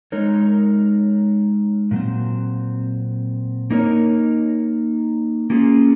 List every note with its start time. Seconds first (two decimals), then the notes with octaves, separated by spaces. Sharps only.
0.12 G#3 D#4 A#4 C#5
1.91 A#2 F#3 C4
3.70 A#3 D#4 A#4 C#5
5.50 A#3 C#4 F4 G#4